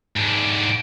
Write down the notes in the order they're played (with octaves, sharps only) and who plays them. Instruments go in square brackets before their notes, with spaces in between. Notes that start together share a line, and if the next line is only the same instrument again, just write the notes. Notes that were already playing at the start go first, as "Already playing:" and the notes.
[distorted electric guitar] G#2 D4